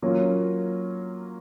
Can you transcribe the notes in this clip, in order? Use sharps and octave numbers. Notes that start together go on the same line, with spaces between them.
F#3 A#3 C#4 F4